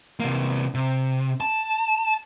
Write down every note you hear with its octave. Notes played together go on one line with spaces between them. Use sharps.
C3 A#3
C3
A5